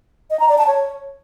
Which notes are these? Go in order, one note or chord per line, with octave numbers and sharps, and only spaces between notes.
D#5
A#5
D5
A5
C#5